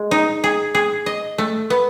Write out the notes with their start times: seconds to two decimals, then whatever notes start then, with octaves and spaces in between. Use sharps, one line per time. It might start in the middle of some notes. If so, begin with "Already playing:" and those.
Already playing: G#3
0.11 D#4
0.44 G#4
0.75 G#4
1.06 D#5
1.38 A3
1.70 B3